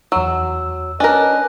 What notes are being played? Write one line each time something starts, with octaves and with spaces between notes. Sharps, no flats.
E2 F#3 E6
C#4 D4 A#4 B4 D#5 G#5 F#6